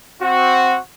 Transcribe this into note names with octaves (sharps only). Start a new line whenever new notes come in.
C4 F#4